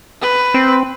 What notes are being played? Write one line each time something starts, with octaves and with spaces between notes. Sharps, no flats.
B4
C4